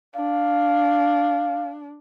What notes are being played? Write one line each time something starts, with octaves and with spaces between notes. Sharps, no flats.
D4 F5